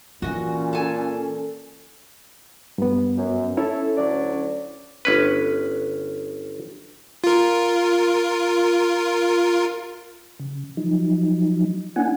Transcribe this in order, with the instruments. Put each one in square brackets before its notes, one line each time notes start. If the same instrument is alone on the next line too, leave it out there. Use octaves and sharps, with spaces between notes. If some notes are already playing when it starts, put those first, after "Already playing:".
[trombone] A#2 [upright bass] E3 [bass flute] C#4 [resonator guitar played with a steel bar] F#4 D#5
[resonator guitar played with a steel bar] A4 G#5
[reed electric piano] G2 B3
[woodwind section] F#2
[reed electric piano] C#4 E4 C#5 [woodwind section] A4
[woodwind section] D2 F#3 D5
[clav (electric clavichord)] G1 C#4 B4
[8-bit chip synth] F4 A#4
[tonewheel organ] C#3
F3 F#3 D#4
A#3 C#4 D4 E4 F#5 G#5